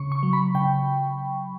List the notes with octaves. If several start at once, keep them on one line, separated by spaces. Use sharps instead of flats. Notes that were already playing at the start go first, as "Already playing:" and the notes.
Already playing: C#3 C#6
C#6
F#3
B5
C#3 G5